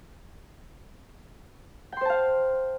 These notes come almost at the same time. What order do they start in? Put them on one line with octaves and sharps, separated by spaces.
G5 C6 C5 A5 F5